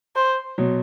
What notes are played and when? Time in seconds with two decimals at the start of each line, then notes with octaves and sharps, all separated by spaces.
0.16 C5
0.58 B2 F#3